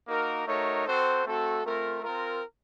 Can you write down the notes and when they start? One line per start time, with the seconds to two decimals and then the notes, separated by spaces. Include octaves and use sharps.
0.08 A#3 D#4 F#4 A#4
0.46 A3 D#4 F#4 A#4 C#5
0.86 C4 F#4 A4 C5
1.25 A3 C4 F#4 A4
1.64 A3 C4 F4 A#4
2.03 C4 F4 A#4